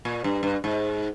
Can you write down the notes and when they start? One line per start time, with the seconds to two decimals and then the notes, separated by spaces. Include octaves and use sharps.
0.05 A#2
0.24 G2
0.43 G2
0.64 G#2